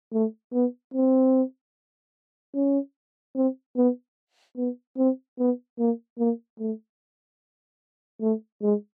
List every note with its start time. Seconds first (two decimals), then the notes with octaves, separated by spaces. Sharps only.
0.13 A3
0.53 B3
0.94 C4
2.54 C#4
3.35 C4
3.77 B3
4.57 B3
4.97 C4
5.39 B3
5.79 A#3
6.19 A#3
6.59 A3
8.21 A3
8.62 G#3